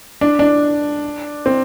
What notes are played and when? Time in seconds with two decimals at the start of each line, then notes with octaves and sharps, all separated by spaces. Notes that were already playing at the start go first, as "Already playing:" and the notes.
0.21 D4
0.39 D4
1.46 C4